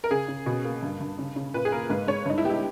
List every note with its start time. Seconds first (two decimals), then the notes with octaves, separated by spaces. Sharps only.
0.04 A#4
0.11 C#3 G#4
0.28 C#3
0.46 B2
0.65 A#3
0.83 G2
1.00 G2
1.19 C#3
1.36 C#3
1.54 A#2 B4
1.65 G#4
1.72 A#3 A#4
1.90 G#2 B4
2.08 G#2 C#5
2.26 G2 D#4
2.38 E4
2.44 B3 G4
2.50 E4